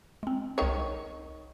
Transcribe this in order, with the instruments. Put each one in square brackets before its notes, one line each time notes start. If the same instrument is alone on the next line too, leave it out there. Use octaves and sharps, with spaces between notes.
[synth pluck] G#3 C4
[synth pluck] C2 C#6 [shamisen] D#3 C#5